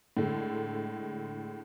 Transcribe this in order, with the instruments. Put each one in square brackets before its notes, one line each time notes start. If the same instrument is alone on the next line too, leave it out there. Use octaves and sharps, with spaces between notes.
[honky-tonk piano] A2 D3 G#3